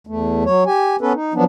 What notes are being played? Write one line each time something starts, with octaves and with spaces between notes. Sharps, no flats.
E2 A3
F#3 C#5
G4 G#5
B3 C#4 A4 B4
D#4
F3 F#3 B3 D4